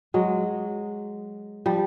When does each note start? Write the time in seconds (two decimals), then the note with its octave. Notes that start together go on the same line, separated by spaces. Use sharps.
0.14 F#3 G#3
1.66 F3 G3